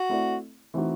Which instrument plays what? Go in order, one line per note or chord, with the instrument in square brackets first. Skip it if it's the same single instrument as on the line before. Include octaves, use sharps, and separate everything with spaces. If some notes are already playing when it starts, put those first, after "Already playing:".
Already playing: [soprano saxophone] F#4
[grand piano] A3 C4 E4 A4 D5
E3 A3 C4 D#4 F#4